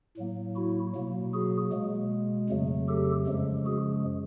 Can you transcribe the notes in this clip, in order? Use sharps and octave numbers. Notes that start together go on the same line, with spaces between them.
A2 F#3 A#3
E4 F#4
B2 F#3 A#3
F#4 G#4
B2 G#3
F2 C#3 F#3 A3
G4 A4
F#2 C#3 F3 G#3
F#4 G#4